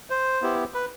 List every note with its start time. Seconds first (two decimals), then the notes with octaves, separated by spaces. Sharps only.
0.10 C5
0.42 B3 E4 G4
0.74 B4